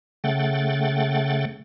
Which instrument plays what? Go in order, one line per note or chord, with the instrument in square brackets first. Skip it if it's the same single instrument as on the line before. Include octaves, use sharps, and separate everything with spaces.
[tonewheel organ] C#3 A3 F#5 G5 A6